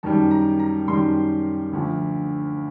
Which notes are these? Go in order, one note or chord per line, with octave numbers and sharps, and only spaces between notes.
F#2 D#3 G3 A5
A#5
A#5
F#2 D#3 G3 C6
D2 D3 F3